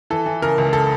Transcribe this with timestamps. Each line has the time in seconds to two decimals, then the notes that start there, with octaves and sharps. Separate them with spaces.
0.10 E3 A4
0.26 E3
0.42 C#3 A#4
0.58 C#2
0.73 A4